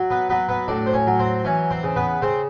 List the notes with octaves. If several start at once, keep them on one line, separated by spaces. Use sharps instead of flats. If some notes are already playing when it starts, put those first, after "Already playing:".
Already playing: F#3
B3 B4
F#3 B3 B4
B3 B4
A2 D4 D5
C5
C#4 C#5
F#3
C4 C5
E3 C#4 C#5
C4 C5
C#3
B3 B4
C#3 C4 C5